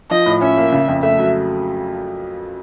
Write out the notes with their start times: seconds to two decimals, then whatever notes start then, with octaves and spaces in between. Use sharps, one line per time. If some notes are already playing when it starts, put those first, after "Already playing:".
0.11 F3 D#5
0.26 A2
0.42 C#4 E5
0.57 A#3
0.72 C#3
0.88 F2
1.03 A3 E5
1.19 F#3